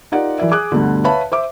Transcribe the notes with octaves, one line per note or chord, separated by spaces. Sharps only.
D#4 F4 G4 A#4 D5 F#5
E3 F#3 A#4 D5 E5
G#4 D6 D#6 F#6
D2 G2 B2 D3
B4 C#5 E5 F5 A5 B5
C5 E5 D6